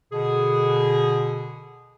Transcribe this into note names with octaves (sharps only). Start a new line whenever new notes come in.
B2 D3 G#4